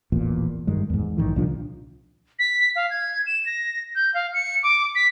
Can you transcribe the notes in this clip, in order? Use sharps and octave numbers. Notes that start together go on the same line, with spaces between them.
D#1 A1 E2 A#2
G2 D#3 G#3
E2 G#2
A#1 E2 D#3 E3
C2 A#2 F3 D4
B6
F5
G#6
E7
A#6
G6
F5
C#7
D6
B6